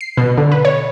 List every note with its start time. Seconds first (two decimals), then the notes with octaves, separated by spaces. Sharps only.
0.01 C7
0.17 B2
0.38 D3
0.52 B4
0.65 C#5